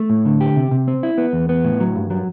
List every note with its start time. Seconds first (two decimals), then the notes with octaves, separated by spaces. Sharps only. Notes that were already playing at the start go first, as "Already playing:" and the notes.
Already playing: A3
0.10 A2
0.25 D3
0.41 G4
0.56 C3
0.71 C3
0.88 C4
1.03 E4
1.18 B3
1.33 E2
1.49 B3
1.64 A2
1.80 F#3
1.96 G2
2.10 F#3